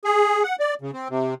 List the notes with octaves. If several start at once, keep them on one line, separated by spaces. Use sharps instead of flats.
G#4
F#5
D5
C#3
C4
C3